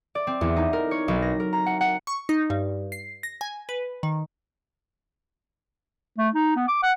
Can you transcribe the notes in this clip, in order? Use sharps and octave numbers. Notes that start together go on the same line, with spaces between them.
D5
C4
E2
D#4
A#4
C#5
B1
A#6
A#4
A#5
F#5
F#5
C#6
D#4
G2
C7
A#6
G#5
B4
D#3
A3
D#4
B3
D6
F#5